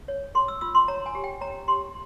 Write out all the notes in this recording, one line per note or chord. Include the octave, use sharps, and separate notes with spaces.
C#5
G#4 C6
E6
F4 E6
C6
C#5 A#5
G#5
G4
G5
C#5 A#5
G4 C6